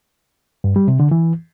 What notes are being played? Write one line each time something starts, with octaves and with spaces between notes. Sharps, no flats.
G2
G3
C3
D3
E3